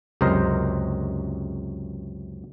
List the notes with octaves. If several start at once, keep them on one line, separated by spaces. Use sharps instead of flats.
C#2 F#2 C3 A#4 C5 D#5